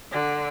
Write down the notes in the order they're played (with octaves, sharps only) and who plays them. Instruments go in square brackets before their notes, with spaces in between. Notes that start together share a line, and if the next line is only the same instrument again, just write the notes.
[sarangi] D3